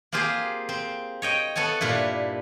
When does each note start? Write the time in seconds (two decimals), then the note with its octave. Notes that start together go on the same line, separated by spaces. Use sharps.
0.12 A#3 C4 F4 G4 G#4
0.69 C4
1.22 C#5 D#5 G5
1.56 B3 A4 C#5 G#5
1.81 G2 A#2 D4 E4